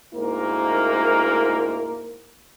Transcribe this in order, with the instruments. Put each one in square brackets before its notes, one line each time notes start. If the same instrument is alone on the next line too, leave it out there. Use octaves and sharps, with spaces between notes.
[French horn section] D2 G#2 A#3 E4 A#4